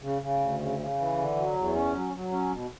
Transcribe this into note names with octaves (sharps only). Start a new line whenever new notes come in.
C#3
C#3
D2
C#3
C#3
E3
D3
F#3
E2
C#4
F#3
F#3
C#4
B2